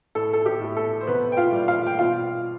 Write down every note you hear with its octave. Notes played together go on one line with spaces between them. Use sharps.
A2 A4
A4
G4
A2
A4
C5
F1 B3 B4
G5
F4 F5
G3
F4 F5
G5
B2 F4 F5